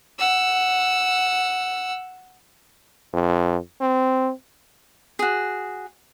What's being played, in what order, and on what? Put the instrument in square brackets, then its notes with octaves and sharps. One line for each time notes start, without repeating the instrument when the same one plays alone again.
[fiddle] F#5 E6
[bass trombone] F2
C4
[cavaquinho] F#4 G#4